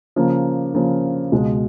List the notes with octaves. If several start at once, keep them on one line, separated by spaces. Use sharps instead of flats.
C#3 F3 A#3
C#3 F3 A#3
C#2 B2 G#3